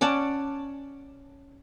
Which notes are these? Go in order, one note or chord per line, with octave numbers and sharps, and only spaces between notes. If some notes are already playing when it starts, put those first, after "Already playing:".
C#4 D5 F#5 A5